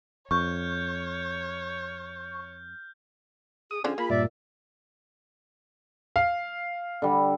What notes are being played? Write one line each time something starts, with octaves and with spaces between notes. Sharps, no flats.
F2 C#5 C#6 F6 G6
G#4 D#6
D3 F3 C#4 D4 G#4
A#3 F4 B5
G2 A#2 D5 E5
F5
D3 G3